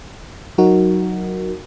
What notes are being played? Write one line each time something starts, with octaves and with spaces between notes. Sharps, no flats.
F#3 D#4 F#4 A#4